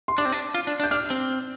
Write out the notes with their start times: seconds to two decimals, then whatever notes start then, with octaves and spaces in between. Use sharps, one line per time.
0.08 C6
0.18 D4 D6
0.25 C4
0.32 D4
0.54 F4
0.67 D4
0.80 D4
0.83 G6
0.91 D4 F6
1.10 C4